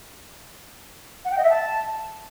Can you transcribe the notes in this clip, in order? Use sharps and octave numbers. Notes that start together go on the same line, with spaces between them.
F#5
G5
D#5
E5
A5